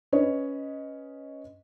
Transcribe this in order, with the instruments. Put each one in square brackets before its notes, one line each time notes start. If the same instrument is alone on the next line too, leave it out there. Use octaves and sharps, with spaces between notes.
[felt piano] C#4 B4 C#5 D#5